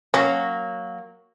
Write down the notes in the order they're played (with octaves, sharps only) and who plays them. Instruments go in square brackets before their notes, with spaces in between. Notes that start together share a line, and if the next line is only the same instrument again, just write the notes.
[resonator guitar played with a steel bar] F#3 A#3 F#4 [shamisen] C#4